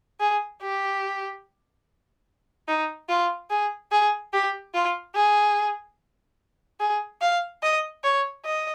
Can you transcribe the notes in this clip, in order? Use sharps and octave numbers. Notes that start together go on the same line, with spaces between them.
G#4
G4
D#4
F4
G#4
G#4
G4
F4
G#4
G#4
F5
D#5
C#5
D#5